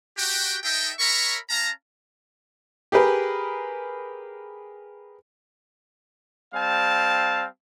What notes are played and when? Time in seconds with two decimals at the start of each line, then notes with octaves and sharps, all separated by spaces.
0.17 F#4 G4 G5
0.63 D#4 A4 D#5 E5 G5
0.98 A#4 C#5 E5 A#5 B5 C#6
1.49 C#4 F5 A5 A#5
2.92 G4 G#4 A#4 B4
6.54 G3 C4 F5 A5